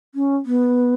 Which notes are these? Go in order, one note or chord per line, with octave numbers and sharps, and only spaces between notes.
C#4
B3